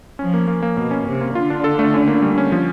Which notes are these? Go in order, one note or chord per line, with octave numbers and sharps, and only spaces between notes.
F3 C#4
A#3
A#3
A#3
B2 A#3
C#4
C3 C#4
A#3
D3 F4
D4
A4
A3
C#4
A#3
G3
C#4
F3